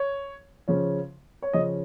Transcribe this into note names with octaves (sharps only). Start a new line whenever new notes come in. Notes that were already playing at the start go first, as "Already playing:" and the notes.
Already playing: C#5
C#3 F3 C#4
C#5
C#3 F3 C#4 D#5